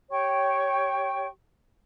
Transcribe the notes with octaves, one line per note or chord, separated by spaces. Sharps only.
G4 C#5 G5 C#6